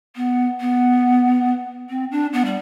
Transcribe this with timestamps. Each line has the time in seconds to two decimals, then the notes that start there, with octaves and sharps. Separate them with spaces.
0.16 B3
0.60 B3
1.89 C4
2.11 D4
2.33 B3
2.45 G3